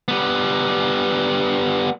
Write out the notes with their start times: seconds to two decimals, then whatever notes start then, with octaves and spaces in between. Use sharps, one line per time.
0.08 G3 B3